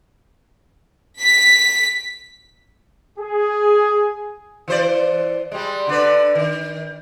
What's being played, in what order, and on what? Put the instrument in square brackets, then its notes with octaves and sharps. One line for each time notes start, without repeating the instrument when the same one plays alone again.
[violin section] B6
[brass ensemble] G#4
[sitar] E3 C5 D5
G3 G#3
D3 D4 B4
D#3